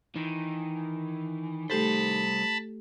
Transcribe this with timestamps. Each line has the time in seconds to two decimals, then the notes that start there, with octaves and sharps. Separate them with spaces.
0.16 D#3 E3
1.70 G3 A3 G4 A4 C5 A5 B5